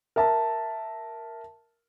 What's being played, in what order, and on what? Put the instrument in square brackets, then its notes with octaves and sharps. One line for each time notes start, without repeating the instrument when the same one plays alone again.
[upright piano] A#4 E5 A5